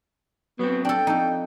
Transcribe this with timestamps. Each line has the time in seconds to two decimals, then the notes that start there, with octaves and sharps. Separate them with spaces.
0.59 F#3 B3 C4
0.85 D4 A4 G5
1.07 F2 D#4 A4